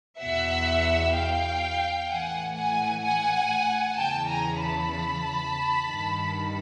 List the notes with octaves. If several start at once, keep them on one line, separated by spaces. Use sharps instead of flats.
E2 B2 E5 F#5
F5 G5
A2 E3 F#5 G#5
F#5 G#5
F#5 G#5
E2 C#3 E3 G5 A5
G#5 A#5
A5 B5
G2 D#3